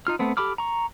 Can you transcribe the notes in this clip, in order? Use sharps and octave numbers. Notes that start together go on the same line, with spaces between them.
D#4 F4 F6
A3 B3 C4
G4 A4 B5 D6 F6
A#5 C#6